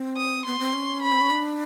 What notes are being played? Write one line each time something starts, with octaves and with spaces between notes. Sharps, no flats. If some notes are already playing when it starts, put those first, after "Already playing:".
Already playing: C4
D#6
B3 C6
C4
C#4
B5
C4
C#4
D4